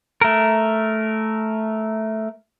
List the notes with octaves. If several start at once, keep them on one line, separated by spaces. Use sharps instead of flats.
A3 A#4